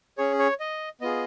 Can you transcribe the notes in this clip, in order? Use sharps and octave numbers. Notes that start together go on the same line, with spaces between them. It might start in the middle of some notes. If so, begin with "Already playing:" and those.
C#4 G#4 C#5
C#5
D#5
B3 F4 G#4 D#5